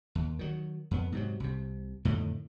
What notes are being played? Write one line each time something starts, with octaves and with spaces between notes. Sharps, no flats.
D#2
D#3 F#3
F2 B3
G#2 C3 F#3
C2 C3
F2 A2 D3 D#3